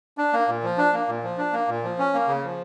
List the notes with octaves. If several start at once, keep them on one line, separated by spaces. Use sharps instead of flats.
D4
A#3
A#2
F3
D4
A#3
A#2
F3
D4
A#3
A#2
F3
C#4
A#3
C#3
F3